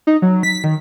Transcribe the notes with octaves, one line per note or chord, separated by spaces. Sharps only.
D#4
F#3
B6
D#3